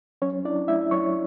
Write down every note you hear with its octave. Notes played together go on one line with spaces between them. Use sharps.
F#3 C#4 C#5
D4 E4 D5
A3 E4 E5
F#3 C#5 C#6